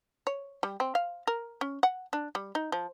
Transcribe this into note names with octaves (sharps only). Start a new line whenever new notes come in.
C#5
G3
C4
F5
A#4
C#4
F#5
D4
G3
D#4
F3